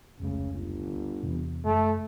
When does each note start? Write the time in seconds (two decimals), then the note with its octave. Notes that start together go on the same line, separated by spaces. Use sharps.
0.20 F1 C#2 C#3 A3
0.52 G1
0.87 D2
1.23 E2 C3
1.64 F#1 A3